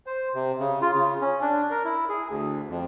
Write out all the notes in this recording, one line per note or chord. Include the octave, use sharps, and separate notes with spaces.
C5
C3
C#3
F4
C#3
C#4
D4
A#4
E4
G#4
D2
F2